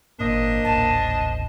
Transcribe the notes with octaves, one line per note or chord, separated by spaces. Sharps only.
G#1 A#2 A#3 D4 C5 D#5
D#1 A1 A#2 A5